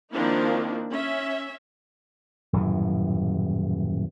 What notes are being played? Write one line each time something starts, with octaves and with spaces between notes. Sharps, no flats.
D#3 F3 A#3 C4 D4 E4
C#4 E5
D#1 F#2 A2 E3